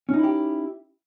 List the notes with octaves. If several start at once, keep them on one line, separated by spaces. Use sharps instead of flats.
C#4 D#4 E4 G4